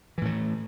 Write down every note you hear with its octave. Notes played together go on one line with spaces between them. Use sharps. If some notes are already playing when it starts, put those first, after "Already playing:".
A2 E3 A3